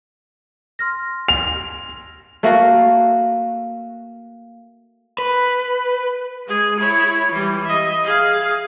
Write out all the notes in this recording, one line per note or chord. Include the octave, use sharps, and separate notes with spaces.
C6 F6 A#6
F7
A3 A#3 F#4
B4
G#3 G#4
E4 C#5
E3 G3
D#5 E5
G#4 F5